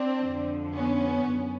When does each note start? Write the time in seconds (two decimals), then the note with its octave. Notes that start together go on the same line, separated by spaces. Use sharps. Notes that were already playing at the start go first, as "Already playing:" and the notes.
Already playing: C4 D4
0.22 F2 D3 F3
0.75 B3 C#4
1.28 F#2